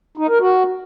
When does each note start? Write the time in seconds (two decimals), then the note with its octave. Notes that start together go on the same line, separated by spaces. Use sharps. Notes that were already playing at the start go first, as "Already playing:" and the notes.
0.17 D#4
0.29 A#4
0.40 F#4